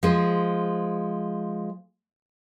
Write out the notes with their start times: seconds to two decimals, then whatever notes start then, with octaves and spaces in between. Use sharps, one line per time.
0.03 F3 G#3 C5